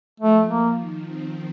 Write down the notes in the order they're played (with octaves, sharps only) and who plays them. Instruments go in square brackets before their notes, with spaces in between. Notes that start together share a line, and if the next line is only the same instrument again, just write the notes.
[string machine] F3 [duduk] A3
[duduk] A#3
[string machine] D#3
C4